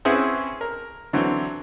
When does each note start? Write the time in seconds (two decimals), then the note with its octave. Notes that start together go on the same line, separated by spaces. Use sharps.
0.05 C4 C#4 E4 G#4 B4 F#5
0.61 A#4
1.13 D3 E3 F#3 C4